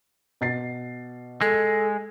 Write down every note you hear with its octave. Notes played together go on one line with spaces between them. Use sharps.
B2 A6 C7
G#3 A4